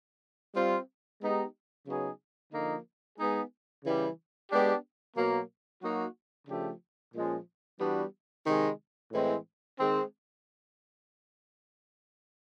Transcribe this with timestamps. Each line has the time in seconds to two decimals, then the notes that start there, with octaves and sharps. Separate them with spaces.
0.54 G3 C4 F4
1.20 G#3 B3 D#4 G4
1.87 C#3 F#3 B3 D#4 G#4
2.52 D3 F3 A#3 D#4
3.18 G#3 B3 D#4 G#4
3.84 C#3 E3 G3
4.50 G#3 B3 D4 G4
5.16 B2 F#3 A#3
5.82 F#3 A#3 D#4 F#4
6.48 C#3 F3 A3 D4 G4
7.15 A#2 F3 G#3 C#4
7.80 E3 G3 B3 D4 F#4
8.47 C3 D#3 G#3
9.12 A2 E3 G#3 C4
9.78 D#3 G#3 C4